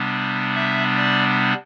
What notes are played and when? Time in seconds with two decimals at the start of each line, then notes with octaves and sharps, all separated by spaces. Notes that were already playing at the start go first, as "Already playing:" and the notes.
Already playing: C3 G3 B3 D4
0.55 E5
0.96 D5